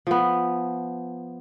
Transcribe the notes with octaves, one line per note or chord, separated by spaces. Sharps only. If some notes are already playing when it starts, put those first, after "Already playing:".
F3 B3